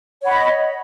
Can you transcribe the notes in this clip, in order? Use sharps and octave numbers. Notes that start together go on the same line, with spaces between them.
C#5 D#5 F#5 B5